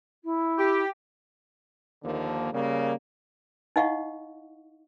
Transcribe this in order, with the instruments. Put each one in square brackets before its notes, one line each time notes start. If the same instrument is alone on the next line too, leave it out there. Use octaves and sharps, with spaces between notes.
[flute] E4
[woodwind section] G4
[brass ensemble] D#2 D3 D#3 F3 A#3
C#3 G3 A#3
[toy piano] D#4 E4 D#5 F5 F#5 C#6